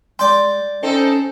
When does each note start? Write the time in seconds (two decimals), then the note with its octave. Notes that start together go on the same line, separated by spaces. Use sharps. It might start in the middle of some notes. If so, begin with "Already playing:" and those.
0.19 G#3 D5 G5 C6
0.83 C4 C#4 D#4 A4